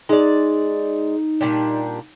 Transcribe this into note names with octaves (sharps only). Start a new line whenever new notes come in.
G#3 D#4 D5
A#2 G3 D4